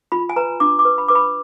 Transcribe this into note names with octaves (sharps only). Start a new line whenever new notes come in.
F4 B5
G#5
B4 A#5
D4 D6
D6
B4
B5
B4 D6
B5